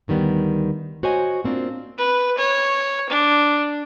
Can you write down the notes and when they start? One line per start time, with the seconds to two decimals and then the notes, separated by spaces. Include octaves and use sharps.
0.08 D2 D#3 G3 B3
1.03 F#4 C5 C#5 D#5 G#5
1.44 A#3 C4 D4 F4
1.98 B4
2.38 C#5
3.09 D4